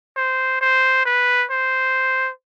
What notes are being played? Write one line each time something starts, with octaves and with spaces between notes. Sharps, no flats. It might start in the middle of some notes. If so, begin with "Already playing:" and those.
C5
C5
B4
C5